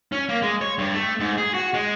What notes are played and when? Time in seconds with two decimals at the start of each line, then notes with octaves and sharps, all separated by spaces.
0.12 C#4
0.29 A#3
0.42 G#3
0.61 C#5
0.78 G2
0.93 A3
1.20 G#2
1.38 G#4
1.54 F#4
1.74 G#3